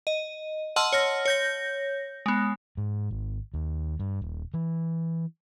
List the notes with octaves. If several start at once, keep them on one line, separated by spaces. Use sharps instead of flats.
D#5
D#5 F#5 A5 C6 E6 F6
C#5 F6 A#6
C#5 G6 A#6
G#3 B3
G#2
G#1
D#2
G2
D#1
E3